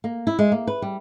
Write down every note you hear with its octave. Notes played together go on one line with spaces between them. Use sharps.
A#3
E4
G#3
A#3
B4
G3